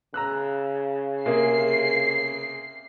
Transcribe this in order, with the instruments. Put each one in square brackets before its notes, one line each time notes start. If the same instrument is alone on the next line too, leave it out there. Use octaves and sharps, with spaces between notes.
[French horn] C#3 [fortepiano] A#5 E6 F#6
[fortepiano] C3 A#3 G#4 [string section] C7